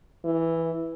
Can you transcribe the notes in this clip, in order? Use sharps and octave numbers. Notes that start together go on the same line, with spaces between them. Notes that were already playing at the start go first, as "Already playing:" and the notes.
E3